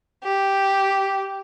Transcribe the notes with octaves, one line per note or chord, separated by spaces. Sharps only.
G4